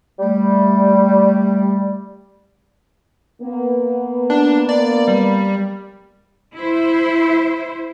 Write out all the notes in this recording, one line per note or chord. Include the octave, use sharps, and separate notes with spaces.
G3 A3
A#3 B3
D4
D5
G3
E4 C5